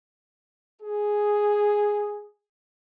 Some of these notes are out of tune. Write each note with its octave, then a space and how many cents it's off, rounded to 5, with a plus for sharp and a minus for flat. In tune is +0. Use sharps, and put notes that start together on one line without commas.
G#4 +0